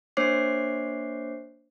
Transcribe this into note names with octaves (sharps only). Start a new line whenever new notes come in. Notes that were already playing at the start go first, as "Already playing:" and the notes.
A#3 D4 C5 C#5 D6 C7